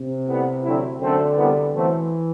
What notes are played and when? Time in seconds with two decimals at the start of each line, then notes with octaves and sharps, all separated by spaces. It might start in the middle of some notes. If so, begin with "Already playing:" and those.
Already playing: C3
0.27 A2 G3 B3
0.64 D3 F#3 A3 C4 E4
1.00 F#2 D3 F#3 A3 C4
1.36 C2 B2 G3 B3
1.73 B2 E3 F#3 A3 C4